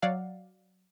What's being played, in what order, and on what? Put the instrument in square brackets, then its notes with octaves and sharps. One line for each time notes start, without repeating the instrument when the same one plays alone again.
[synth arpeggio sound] F#3 D5 F5 F#5